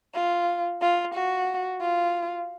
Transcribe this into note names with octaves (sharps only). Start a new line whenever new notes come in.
F4
F4
F#4
F4